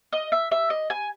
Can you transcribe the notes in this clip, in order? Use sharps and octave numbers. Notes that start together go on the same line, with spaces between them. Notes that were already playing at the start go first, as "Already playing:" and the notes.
D#5
E5
E5
D#5
G#5